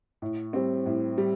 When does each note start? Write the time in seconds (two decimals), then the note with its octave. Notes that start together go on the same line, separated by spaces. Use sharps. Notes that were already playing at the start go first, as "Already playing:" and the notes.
0.22 A2
0.53 G3 C4
0.86 A2
1.18 G3